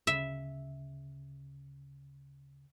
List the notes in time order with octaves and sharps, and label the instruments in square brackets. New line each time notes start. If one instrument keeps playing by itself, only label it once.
[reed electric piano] D2 C#3 [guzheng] E5